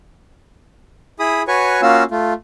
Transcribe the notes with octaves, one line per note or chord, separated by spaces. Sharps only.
E4 G#4 B5 D#6
F#4 B4 C#5 G#5 C#6
A#3 C#4 F4 F#4 F5 E6
A3 F4